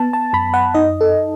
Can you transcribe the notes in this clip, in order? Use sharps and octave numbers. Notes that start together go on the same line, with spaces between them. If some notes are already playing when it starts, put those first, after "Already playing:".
Already playing: B3 A5
A5
F#2 B5
F#5
D#4 D#5
A4